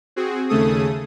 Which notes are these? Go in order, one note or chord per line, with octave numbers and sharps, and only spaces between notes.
C4 F#4 G#4
D#2 C#3 A3 G#4 A4 D#6